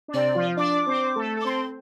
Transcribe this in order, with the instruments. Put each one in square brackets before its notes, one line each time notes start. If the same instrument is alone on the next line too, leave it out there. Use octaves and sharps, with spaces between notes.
[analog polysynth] D4
[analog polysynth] C3 C4 [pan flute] D5
[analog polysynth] F3 F4
[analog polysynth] D4 D5 [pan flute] D6
[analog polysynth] C4 C5
A3 A4
A4
[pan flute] D6
[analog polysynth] C4 C5 [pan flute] C6